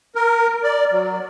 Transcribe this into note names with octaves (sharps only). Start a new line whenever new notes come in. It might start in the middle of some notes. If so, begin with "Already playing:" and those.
A#4
D5
F#3